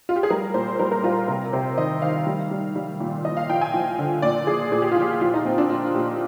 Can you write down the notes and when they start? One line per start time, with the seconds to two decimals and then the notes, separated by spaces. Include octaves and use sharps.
0.09 F4
0.16 G4
0.23 G#4
0.30 G3 A#4
0.54 A#2 C5
0.79 G3 A#4
0.92 A#4
1.04 G3 F4
1.28 C3 A#4
1.53 C3 C5
1.77 D#3 D#5
2.02 D#3 F5
2.27 G3
2.51 G3
2.76 G3
3.00 A#2
3.25 F3 D#5
3.37 F5
3.50 F3 G5
3.61 G#5
3.74 F3
3.98 D3
4.22 A#2 D5
4.47 F3 G#4
4.72 A#2 G#4
4.82 G4
4.91 F4
4.96 F3
5.01 G4
5.21 F3 F4
5.34 D#4
5.45 A#2 C4
5.58 D4
5.70 A#2 F4
5.94 A#2 G4